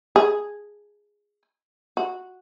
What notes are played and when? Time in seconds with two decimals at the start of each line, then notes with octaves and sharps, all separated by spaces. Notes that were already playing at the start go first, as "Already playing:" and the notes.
0.16 G#4
1.97 F#4